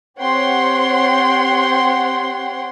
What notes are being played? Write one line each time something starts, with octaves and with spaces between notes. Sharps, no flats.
C4 G4 C#5 F#5 G5 C6